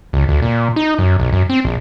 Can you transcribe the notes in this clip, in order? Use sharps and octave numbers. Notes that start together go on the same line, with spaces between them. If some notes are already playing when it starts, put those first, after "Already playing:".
C#2
D2
A#2
D#4
F#2
B1
F#2
C4
A#1